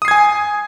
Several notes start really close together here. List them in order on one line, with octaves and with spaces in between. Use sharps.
D#6 C7 G#6 G#5